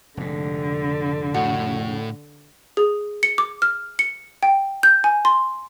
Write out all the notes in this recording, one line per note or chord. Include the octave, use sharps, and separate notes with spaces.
F1 G#2 D3
A2 F#4
G#4
C#7
D6
F6
C#7
G5
G6
G#5
C6